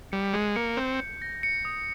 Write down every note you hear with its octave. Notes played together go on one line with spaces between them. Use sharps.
G3 C#7
G#3 C#7
A#3 C#7
C4 G6
G6
A#6
C#7
D#6